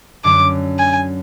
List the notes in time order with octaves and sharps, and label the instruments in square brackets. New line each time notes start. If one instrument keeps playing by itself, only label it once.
[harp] F#2 D3 F#3 [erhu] D6
[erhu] G#5